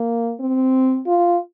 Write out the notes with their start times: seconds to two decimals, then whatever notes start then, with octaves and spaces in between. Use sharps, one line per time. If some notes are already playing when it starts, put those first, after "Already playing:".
Already playing: A#3
0.40 C4
1.07 F4